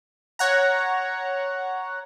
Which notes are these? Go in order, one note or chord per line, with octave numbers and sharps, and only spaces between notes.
C#5 F#5 A#5